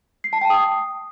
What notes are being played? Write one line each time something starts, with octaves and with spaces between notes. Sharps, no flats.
C7
A5
G5
D#6